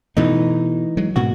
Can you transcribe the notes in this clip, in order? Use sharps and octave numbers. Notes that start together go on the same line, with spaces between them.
B2 E3 A3 D#4
F#3 G#3
G#2 B2 A#3 F#4